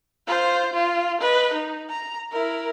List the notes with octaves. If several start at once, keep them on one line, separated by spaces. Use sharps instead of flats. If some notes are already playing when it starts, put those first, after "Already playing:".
F4 C5
F4
B4 D#5
D#4
A#5
E4 A#4